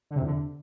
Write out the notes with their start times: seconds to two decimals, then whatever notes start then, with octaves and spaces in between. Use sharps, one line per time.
0.11 D3
0.16 C3
0.21 E2
0.26 D3